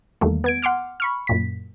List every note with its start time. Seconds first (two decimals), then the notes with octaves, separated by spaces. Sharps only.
0.21 E2 D#3 G3 A3 A#3
0.44 B3 G#6 D7
0.62 F#5 C6 D6 F6
1.00 B5 C#6 F6
1.27 F#2 A#2 B6